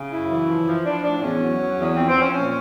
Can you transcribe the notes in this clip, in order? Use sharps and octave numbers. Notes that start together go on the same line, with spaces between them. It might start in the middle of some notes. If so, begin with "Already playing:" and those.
Already playing: C#3
F#2 E4
E3
F3
F3
F3 D4
A2 D4
E2 C#4
F#3
F#3
E2
F3 C4
C4
F3
C#4
A#2 C#4